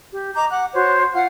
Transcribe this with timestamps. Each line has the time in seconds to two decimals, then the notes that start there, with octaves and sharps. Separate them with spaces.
0.13 G4
0.34 D#5 A#5 D6 G6
0.50 F#5 D6 F#6
0.73 F#4 C5 C#5
1.13 F4 F5 F#5 F6